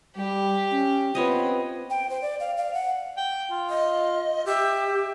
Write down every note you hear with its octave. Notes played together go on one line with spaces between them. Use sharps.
G3 G4
C#4
B3 C4 F4 C#5 D#5
G5
C5
D5
F5
F5
F#5
G5
F4
D#5
G4 E5